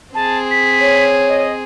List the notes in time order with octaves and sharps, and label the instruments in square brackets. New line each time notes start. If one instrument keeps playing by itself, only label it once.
[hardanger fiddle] C4 G#4 [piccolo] A5
[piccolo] B6
[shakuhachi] C#5
[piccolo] D#5